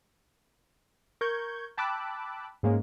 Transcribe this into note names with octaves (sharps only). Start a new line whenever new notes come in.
A#4 C#6 G6 G#6
G5 A5 B5 D6 E6 F#6
G#2 G#3 A#3 C#4